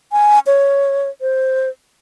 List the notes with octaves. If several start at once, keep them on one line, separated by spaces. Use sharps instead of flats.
G#5
C#5
C5